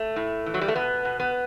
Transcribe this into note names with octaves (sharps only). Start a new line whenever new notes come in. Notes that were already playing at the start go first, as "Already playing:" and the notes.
Already playing: A3
A2
E3
F#3
G3
A3
B2 B3
B2
B3